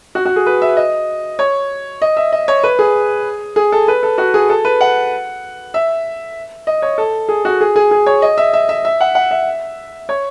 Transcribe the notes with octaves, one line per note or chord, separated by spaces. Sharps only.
F#4
F#4
G#4
B4
E5
D#5
C#5
D#5
E5
D#5
C#5
B4
G#4
G#4
A4
B4
A4
F#4
G#4
A4
B4
F#5
E5
D#5
C#5
A4
G#4
F#4
G#4
G#4
G#4
C#5
D#5
E5
E5
E5
E5
F#5
F#5
E5
C#5